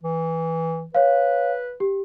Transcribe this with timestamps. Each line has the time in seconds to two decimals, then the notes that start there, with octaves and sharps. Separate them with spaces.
0.03 E3
0.95 B4 C#5 F5
1.80 G4